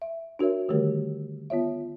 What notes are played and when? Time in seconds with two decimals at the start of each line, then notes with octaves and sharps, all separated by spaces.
0.02 E5
0.39 D4 F#4 A#4 C#5 E5
0.69 D3 D#3 G3 A3 G4 A#4
1.50 B3 F4 C#5 E5